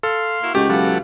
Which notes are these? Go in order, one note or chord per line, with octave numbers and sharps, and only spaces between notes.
A4 F5 C6
A#3 E4 F#4
C#2 A3 D#4 F#4 G4
B2 E3 F#3 F4 A4 F#5